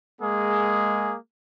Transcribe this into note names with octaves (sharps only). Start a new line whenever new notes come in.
G#3 A#3 G#4